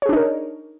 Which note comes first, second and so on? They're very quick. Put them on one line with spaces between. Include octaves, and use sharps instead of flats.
C#5 G#4 D4 D#4 A#4